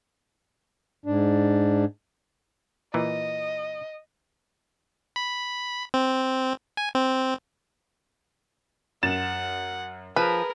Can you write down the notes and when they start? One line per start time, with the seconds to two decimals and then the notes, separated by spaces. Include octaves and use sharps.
1.06 G#2 D4
2.94 A#2 E3 D#5
5.16 B5
5.94 C4
6.77 G#5
6.95 C4
9.03 F#2 F#5 A6 E7
10.16 F3 G#4 A#4 B4